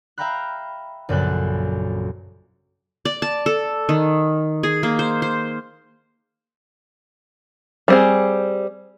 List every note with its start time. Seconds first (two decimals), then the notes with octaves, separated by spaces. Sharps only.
0.18 E5 F5 G5 A#5 B5 F#6
1.09 A#1 F#2 A#2 C#3 A4 F#6
3.05 D5
3.22 A5
3.46 A4
3.89 D#3
4.63 G#4
4.83 A#3
4.99 C5
5.22 C5
7.88 G3 C4 G#4